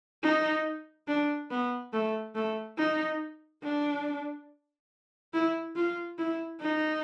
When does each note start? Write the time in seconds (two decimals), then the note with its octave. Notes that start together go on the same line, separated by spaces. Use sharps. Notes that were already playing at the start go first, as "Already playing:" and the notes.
0.23 D#4
1.08 D4
1.51 B3
1.93 A3
2.35 A3
2.77 D#4
3.63 D4
5.33 E4
5.76 F4
6.18 E4
6.61 D#4